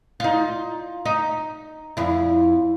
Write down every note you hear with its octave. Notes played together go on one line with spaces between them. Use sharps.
D#4 F4
D#4
F2 E4